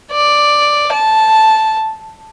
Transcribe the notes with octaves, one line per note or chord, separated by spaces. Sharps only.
D5
A5